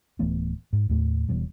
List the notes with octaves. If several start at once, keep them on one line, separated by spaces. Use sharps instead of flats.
D1 E3 A3 B3
G#2
D#2 A2 A3
E1 E2 B2 G3